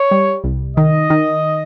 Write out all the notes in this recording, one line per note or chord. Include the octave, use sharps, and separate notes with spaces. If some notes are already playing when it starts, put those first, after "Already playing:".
Already playing: C#5
G3
C2
D#3 D#5
D#3